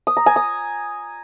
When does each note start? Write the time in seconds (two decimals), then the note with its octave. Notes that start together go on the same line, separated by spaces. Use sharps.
0.07 D#6
0.17 A#5
0.26 G#5
0.36 D#6